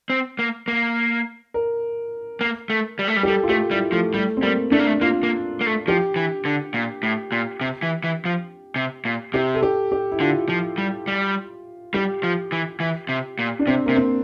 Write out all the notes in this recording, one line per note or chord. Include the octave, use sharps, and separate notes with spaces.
C4
A#3
A#3
A#4
A#3
A3
G3
A3
G3
G4
G3 A4
F4
A3 G4
G3 E4
F3 A3
G3 A3
C4
G3 A#3
A3 D4
A#3
A3
A#3 F4
A#3
A#3
A3
F3 G4
E3
D3
A#2
A2
A#2
C3
E3
E3
F3
C3
A#2
C3 G4
A4
G4
G4
E4
D3 F4
F3
G3
G3
G3 G4
F3
E3
E3
C3
A#2
D4
C3 C4
C3 A#3
C4